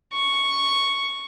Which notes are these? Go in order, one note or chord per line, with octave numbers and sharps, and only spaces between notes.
C#6